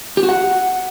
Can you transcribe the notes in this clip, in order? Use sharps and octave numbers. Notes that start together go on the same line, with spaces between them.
G4
F#4
F#5